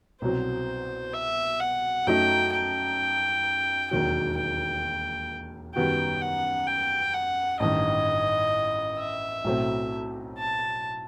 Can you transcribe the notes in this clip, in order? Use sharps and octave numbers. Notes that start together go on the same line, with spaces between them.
C2 B2 F#3 C4 C5
E5
F#5
F#2 F#3 A3 D#4 G5
G5
E1 D#2 D#3 F#3 G5
G5
F#2 D#3 G3 B3 F#4 G5
F#5
G5
F#5
A1 G2 D#3 D#5
E5
B1 A2 F#3 A3 C4
A5